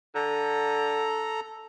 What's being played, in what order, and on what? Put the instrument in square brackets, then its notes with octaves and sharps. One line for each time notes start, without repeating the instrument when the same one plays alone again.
[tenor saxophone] D3 [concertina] A4 A#5